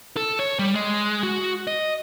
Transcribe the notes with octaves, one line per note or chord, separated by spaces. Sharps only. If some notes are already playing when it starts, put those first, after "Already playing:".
A4
C#5
G3
G#3
F#4
D#5